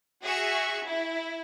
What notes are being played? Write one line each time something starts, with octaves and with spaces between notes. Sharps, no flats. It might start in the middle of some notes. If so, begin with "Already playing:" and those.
F#4 G#4 E5 C#6
E4